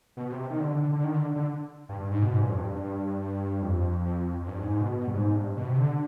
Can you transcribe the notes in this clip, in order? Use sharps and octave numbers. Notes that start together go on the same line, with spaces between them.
B2
C3
D#3
D3
D3
D3
D3
D#3
D3
D3
G2
G2
G#2
B2
G#2
G2
F2
G2
G2
F2
F2
G2
G#2
G#2
B2
B2
G2
G#2
G2
B2
C3
D3